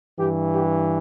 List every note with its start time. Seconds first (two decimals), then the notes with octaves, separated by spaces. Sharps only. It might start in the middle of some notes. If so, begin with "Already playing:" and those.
0.19 G2 E3 G4
0.54 G4